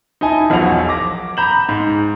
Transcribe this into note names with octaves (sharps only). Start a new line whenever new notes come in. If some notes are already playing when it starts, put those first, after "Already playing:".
D#4 E4 D#5 G#5 A5
E1 B1 F3 F#5 F7
D6 A#6
A#5 B5 G6 E7 F#7
G#2